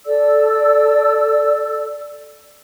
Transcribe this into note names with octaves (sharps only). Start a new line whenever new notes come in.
A4 D5 E6